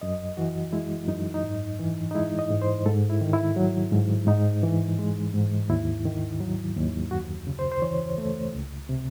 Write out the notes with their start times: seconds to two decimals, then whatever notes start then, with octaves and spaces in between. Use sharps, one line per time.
0.01 F#2 D#5
0.37 E3 F#4
0.73 G#3 E4
1.08 F#2 D#4
1.34 D#4
1.43 G#2
1.79 E3
2.11 D#4
2.15 G#3 E4
2.39 D#5
2.50 G#2
2.62 C5
2.86 G#2 A4
3.10 E4
3.21 D#3
3.33 E4
3.56 F#3
3.92 G#2
4.27 G#2 D#4
4.63 E3
4.99 G#3
5.33 G#2
5.70 D#2 E4
6.05 D#3
6.40 F#3
6.76 D#2
7.11 F#2 F#4
7.47 C#3
7.59 C5
7.72 C5
7.82 E3 C#5
8.18 A3
8.53 C#2
8.89 C3